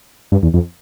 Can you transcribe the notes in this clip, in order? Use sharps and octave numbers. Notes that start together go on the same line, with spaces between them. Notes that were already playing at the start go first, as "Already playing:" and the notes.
G2
E2
F2